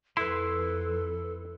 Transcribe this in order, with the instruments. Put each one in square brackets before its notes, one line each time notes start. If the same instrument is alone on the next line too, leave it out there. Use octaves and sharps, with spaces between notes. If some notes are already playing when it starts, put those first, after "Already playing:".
[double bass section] F2 [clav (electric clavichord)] E4 [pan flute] A4 [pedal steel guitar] B4 C6